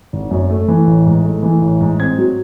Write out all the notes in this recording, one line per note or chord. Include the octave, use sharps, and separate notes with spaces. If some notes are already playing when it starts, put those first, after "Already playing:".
G#1
F#2
A3
E3
A1
G#2
A3
E3
A1
G#2
C4 G#6
F#3